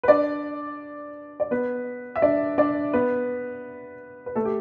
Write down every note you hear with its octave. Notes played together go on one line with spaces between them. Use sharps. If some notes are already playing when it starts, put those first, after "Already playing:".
B4
D4 D5
D5
B3 B4
E5
D4 D5
D4 D5
B3 B4
B4
A3 A4
G4